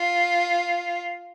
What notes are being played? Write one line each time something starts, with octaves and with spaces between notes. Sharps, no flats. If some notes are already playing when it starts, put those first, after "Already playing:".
Already playing: F4